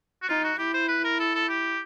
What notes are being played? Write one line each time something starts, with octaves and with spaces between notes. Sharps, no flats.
F#4
D#4 F4
F#4
E4 G4
C5
B4
A#4
A4
A4
G4